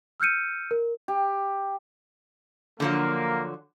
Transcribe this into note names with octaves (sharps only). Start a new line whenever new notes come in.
E6 F6 G6 C#7 D#7
A#4
G4
D3 F3 F#3 A#3